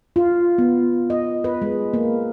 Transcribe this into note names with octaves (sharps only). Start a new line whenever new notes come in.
F4
B3
D#5
B4
G#3
A#3